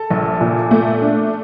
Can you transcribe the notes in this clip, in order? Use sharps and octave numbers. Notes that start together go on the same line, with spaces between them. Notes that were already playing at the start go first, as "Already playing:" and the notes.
Already playing: A4
A#1
A#2
A3
D4